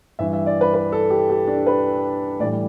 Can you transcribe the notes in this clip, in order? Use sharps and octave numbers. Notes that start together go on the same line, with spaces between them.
G2 E3 G3 E5
E5
D5
B4
B4
A4
G4
G4
D4
B4
A2 E3 G3 D5